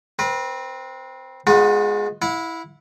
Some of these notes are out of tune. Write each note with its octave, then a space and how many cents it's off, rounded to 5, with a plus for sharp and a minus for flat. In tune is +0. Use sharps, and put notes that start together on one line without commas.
C4 +0 B4 -40
G#3 +0 B3 +5 F4 +45
E4 -5 F#5 -45